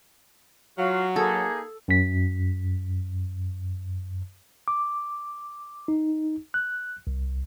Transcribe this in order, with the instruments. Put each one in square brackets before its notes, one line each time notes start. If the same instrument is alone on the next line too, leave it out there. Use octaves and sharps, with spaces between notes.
[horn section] F#3 [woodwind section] F4 F#4 F5
[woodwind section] A#3 D#4 G#4 [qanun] A4
[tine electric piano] F#2 B6
D6
D#4
F#6
C2